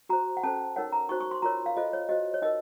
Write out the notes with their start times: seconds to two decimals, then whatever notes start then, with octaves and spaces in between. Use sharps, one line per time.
0.09 F#4 C5 A#5
0.37 F#5
0.43 C#4 A4 C5 A5
0.76 D#4 A#4 C#5 F#5
0.92 A#5
1.09 D#4 F#4 C5 C#6
1.20 C#6
1.31 C6
1.42 F4 A#4 C#5 A#5
1.66 F5
1.77 F4 A4 C5 D#5
1.93 C#5
2.09 F#4 C5 D#5
2.34 C#5
2.42 D#4 A#4 D#5